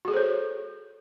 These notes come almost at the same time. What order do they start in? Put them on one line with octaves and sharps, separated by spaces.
F#4 G#4 A4 C5 C#5